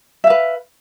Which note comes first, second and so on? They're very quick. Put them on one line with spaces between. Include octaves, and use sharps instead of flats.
E5 F5 B4